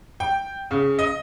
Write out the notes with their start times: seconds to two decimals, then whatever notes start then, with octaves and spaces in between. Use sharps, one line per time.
0.20 G5
0.71 C#3
0.99 D#5